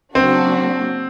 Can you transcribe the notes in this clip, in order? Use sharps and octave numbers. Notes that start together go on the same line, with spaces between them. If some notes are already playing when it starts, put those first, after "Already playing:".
C#3 F#3 A#3 C4 D4 F#4